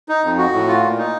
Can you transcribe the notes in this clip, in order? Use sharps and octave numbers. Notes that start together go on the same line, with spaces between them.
D#4
F2
F#4
A2
F4
A#2
D#4